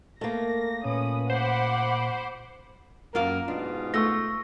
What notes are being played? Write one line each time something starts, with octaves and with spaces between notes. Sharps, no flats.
A3 A#3 A#4 A#6
A#2 C#4 B4 D#6
C5 F#5 B5 D6
F#2 A#3 F4 A#4 F5
G#2 B2 D4 F4
A3 C#6 E6 A#6